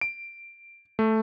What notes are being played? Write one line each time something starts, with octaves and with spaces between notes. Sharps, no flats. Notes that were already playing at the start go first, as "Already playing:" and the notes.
D7
A3